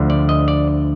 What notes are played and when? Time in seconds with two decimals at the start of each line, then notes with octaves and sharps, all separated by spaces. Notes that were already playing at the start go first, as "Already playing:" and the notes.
Already playing: D2 D3 F3
0.10 D5
0.29 D#5
0.48 D5